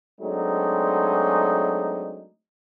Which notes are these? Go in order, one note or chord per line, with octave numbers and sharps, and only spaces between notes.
F#3 G#3 A3 C4 D4 D#4